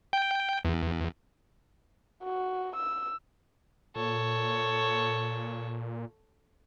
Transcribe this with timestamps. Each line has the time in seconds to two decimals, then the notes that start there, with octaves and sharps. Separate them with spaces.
0.13 G5
0.65 E2
2.24 F#4
2.76 E6
3.96 A#2 A4 C#5